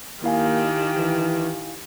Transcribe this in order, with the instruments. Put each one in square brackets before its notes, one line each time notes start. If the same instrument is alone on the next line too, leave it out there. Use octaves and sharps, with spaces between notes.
[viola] D#3 G4 [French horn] A#3 [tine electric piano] E4 F5 G#5
[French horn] E3